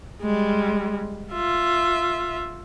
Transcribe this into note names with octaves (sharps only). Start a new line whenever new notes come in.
G3 G#3
F4 E5